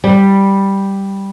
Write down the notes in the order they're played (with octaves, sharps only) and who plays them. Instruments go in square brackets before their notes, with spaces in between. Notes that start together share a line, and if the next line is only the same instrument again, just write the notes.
[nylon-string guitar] G3